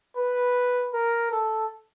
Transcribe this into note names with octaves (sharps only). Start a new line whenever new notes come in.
B4
A#4
A4